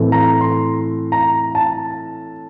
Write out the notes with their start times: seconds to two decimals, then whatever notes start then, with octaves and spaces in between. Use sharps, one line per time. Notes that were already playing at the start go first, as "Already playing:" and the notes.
Already playing: A2 E3 A3 C4
0.12 A#5
0.41 C6
1.12 A#5
1.55 A5